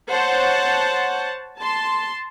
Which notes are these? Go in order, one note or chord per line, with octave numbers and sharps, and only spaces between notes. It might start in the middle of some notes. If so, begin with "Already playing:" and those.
C5 C#5 F#5 A5
A5 C6